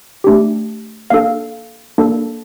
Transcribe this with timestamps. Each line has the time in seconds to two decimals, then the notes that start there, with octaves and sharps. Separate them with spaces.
0.24 A3 D4 G4
1.10 A#3 D4 A4 F5
1.98 A#3 D4 A4